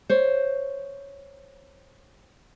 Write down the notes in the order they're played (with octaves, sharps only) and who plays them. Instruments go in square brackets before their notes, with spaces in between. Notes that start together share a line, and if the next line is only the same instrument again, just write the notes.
[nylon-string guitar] C5 C#5